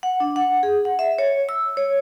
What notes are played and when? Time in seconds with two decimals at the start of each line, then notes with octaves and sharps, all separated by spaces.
0.03 F#5
0.20 D4
0.36 F#5
0.63 G#4
0.85 F#5
0.99 E5
1.19 C#5
1.49 E6
1.77 C#5